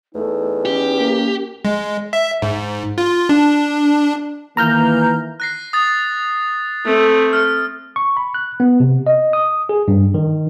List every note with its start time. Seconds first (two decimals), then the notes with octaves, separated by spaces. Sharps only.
0.14 E2 A3 D#4
0.65 C#4 G4
0.99 A#3
1.65 G#3
2.13 E5
2.42 G#2
2.98 F4
3.29 D4
4.57 D#3 E3 A#3 A#5 F6 G6
5.40 F#6 A#6 C7
5.73 D#6 A6
6.85 A3 C4
7.33 F6
7.96 C#6
8.17 B5
8.34 F#6
8.60 B3
8.80 C3
9.07 D#5
9.33 D#6
9.69 G#4
9.88 G2
10.14 D#3